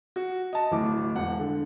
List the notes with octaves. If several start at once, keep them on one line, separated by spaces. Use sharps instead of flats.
F#4
D#5 A5
D1 A2 D6
E1 F#5
D3